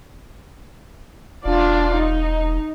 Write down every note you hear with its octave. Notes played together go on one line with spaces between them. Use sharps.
E1 D4 F4 D5
D#4